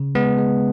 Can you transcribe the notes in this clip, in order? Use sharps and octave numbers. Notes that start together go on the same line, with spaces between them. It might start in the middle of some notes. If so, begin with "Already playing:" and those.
Already playing: C#3
G#3 B3
G#3